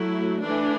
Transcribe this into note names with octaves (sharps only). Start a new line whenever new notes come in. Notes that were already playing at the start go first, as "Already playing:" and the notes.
Already playing: F#3 A3 E4
E3 A3 D4